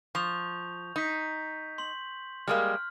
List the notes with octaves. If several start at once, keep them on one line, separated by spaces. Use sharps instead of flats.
F3 C#6 G6 F7
D#4 G6 B6
C6 F#7
G3 G#3 A#3 F6